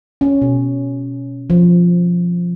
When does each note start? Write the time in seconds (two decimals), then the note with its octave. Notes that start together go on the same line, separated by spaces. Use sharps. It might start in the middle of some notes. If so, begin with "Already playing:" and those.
0.21 C#4
0.42 B2
1.50 F3